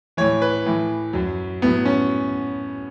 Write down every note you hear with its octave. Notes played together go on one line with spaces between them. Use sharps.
A2 E3 C#5
B4
A2 E3
F#2 F#3
A2 F#3 B3
C#4